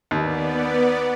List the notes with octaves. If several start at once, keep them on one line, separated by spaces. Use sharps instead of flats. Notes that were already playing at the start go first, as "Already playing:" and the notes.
D#2 B3 D5